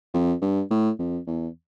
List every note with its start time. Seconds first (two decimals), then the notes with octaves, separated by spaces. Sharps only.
0.14 F2
0.42 G2
0.71 A2
0.99 F2
1.28 E2